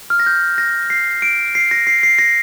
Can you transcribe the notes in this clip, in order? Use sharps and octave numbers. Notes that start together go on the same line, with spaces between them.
F6
A#6
G6
A#6
C7
D7
C7
A#6
C7
C7
A#6